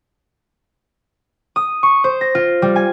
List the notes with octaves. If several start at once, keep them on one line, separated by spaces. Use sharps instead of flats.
D#6
C#6
C5
A#6
F4
G3
G#5